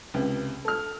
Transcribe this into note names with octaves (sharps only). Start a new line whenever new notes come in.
C#2 C3
A4 F6